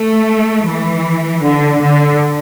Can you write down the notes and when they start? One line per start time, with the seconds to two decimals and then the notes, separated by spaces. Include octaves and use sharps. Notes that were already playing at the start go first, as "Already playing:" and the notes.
Already playing: A3
0.67 E3
1.44 D3
1.82 D3